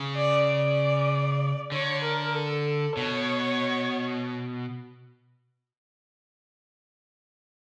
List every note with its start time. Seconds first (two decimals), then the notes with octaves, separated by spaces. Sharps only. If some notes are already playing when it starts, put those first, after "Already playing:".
Already playing: C#3
0.16 D5
0.48 D5
1.72 D3 C#5
2.04 A#4
2.35 A4
2.97 B2 C#5